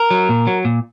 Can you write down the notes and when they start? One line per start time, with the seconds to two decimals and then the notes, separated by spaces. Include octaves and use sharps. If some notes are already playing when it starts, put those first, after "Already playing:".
Already playing: A#4
0.11 F#3
0.29 A#2
0.47 F#3
0.65 A#2